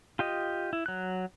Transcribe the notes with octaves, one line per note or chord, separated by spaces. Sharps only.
F4 G4 D#5
E4
F#3 F#6